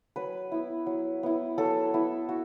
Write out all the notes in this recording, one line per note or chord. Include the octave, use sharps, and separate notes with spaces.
F#3 B4
B3 E4
F#3
B3 E4
F#3 A4
B3 E4
F#4